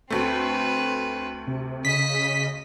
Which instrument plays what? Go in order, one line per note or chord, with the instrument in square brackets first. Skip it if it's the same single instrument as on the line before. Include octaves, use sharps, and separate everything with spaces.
[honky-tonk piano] D2 A3 [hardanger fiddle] C4 B4
[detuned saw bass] C3
[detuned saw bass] C#3 [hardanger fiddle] D#5 [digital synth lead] B6